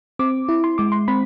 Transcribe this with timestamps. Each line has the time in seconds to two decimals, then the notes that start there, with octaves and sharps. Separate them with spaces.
0.19 C4 D6
0.49 E4
0.64 C6
0.78 G#3 D6
0.92 C6
1.08 C4 B5